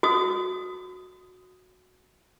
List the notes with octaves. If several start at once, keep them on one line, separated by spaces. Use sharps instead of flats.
F#4 D#6